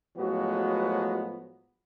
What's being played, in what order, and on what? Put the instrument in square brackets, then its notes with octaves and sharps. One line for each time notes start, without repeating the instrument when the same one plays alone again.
[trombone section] A2 F3 F#3 G#3 B3 F#4